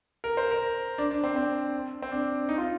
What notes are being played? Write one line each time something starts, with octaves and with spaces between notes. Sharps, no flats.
A#4
C5
A#4
D4
D4
C4
C4
C4
D4
D#4
F4